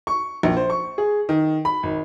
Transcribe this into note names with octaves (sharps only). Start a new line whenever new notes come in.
C#6
A#1
C5
C#6
G#4
D#3
B5
G#1